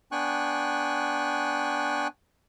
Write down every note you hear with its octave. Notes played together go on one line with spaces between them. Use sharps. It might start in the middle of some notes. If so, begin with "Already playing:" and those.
B3 D4 G5 G#5 C#6 F#6